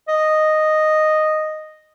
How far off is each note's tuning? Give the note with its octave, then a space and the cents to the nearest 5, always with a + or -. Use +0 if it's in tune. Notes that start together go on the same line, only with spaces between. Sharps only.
D#5 -5